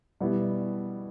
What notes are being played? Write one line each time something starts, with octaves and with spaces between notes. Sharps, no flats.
B2 G3 B3 E4